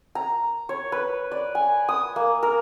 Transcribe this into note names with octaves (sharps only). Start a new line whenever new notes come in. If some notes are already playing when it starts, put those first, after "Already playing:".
A#5
C#5
B4
D5
G#5
D#6
A#3
A#4